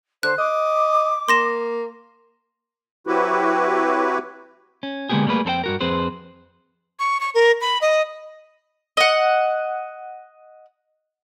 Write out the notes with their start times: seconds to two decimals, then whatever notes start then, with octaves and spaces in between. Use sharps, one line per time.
0.23 D3 C5 F#6
0.39 D#5 D6
1.29 A#3 C6 A#6 E7
3.07 F#3 C4 E4 F#4 G4 B4
4.83 C#4
5.09 D3 G#3 A#3 B3 G4 G#4
5.27 G3 A3 A#3 G#4 B4
5.45 F2 C4 A4 C5 G5
5.64 G2 F#4 A#4
5.81 F2 C4 G#4 B4 C5
6.99 C#6
7.20 C#6
7.35 A#4
7.61 B5
7.81 D#5
8.97 D#5 F#5